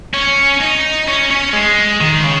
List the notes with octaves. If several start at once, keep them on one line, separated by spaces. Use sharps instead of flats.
C#4
D#4
C#4
C#4
G#3
D#3
C#3